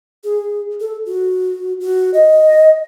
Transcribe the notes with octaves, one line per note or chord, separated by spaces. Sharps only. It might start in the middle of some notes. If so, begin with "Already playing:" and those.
G#4
A4
F#4
F#4
D#5